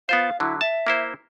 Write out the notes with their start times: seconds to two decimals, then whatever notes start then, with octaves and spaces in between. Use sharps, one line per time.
0.09 B3 F4 C5 F5
0.40 D3 F#3 E4
0.61 E5 A5
0.87 A#3 E4 C5